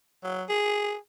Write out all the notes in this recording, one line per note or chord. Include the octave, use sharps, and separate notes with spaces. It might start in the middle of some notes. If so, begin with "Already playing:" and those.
F#3
G#4